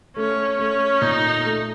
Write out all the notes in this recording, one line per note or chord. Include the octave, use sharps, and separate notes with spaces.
A3 C#4
A3 C#4
A#2 D#4
A3